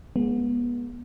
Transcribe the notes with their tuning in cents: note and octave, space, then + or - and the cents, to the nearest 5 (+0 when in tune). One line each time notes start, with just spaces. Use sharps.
G#3 +0 B3 -35